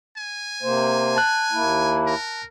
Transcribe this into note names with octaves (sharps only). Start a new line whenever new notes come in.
G#5
C3 A#3 C5
A5 F#6
D#2 A#3 E4
A#4